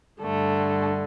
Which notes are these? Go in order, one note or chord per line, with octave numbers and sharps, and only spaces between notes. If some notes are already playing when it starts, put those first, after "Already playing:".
G2 D3 A3